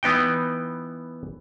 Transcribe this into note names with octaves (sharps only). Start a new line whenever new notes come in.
E3 B3 D#4 G5